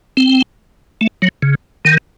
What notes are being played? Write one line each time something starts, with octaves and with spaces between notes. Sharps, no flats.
C4
A3
F#3
C#3
D#3